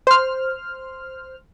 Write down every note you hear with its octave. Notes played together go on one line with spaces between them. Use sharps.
C5 F6